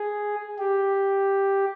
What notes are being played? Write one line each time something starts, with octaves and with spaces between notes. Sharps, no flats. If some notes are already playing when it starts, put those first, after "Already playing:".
Already playing: G#4
G4